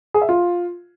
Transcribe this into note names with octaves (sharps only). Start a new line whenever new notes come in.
G#4
E5
F4